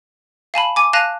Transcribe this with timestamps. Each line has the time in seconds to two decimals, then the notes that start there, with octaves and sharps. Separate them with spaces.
0.54 F5 G#5 A5 B5
0.76 G#5 D6
0.93 F5 A5 F#6 A#6 D#7 F7